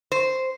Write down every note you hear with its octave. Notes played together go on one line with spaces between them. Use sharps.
C5